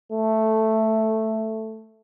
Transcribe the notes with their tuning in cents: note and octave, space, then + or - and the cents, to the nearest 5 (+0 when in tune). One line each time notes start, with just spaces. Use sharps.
A3 +0